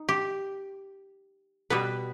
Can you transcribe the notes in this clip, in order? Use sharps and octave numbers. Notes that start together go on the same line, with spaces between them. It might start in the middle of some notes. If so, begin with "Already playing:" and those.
Already playing: D#4
G4
B2 G3 B3 B4